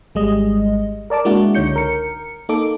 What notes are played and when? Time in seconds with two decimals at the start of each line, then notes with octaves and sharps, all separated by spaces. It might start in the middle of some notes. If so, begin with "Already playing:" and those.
0.15 G#1 G3 G#3 D#5
1.10 A#4 D5 A5 D6
1.25 G#3 A#3 D4 E4 F#4
1.55 C#2 D3 D#4 C#5 G6 C#7
1.76 A#4 C#7
2.49 A#3 D#4 A4 D6